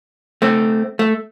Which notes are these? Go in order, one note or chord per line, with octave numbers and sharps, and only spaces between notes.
A3 C4
A3